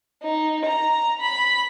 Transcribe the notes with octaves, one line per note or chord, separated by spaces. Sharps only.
D#4
A#5
B5